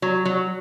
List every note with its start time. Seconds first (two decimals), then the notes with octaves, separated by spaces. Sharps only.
0.02 F#3
0.25 F#3